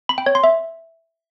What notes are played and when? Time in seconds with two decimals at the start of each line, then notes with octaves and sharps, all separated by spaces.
0.09 B5
0.18 G5
0.26 C#5
0.35 C6
0.44 E5